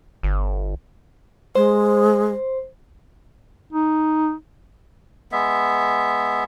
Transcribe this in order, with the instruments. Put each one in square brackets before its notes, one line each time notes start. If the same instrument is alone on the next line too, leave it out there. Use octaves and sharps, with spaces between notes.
[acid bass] G1
[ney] G#3 [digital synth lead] C5
[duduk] D#4
[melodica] G#3 B3 E5